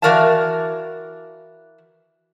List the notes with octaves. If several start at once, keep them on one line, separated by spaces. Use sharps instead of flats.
E3 F#4 A#4 D5 F5 A5